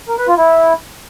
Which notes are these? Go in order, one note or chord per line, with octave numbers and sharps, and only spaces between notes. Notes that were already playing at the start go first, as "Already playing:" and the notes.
A#4
B4
F4
E4